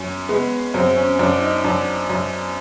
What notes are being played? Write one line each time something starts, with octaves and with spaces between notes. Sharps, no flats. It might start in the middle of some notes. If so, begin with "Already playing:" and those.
Already playing: F#2 C#4
G#3 B3
F#2 C4
C#4
F#2 D4
D#4
F#2 D4
F#2